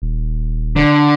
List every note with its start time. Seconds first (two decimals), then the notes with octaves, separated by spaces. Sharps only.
0.02 D#1
0.76 D3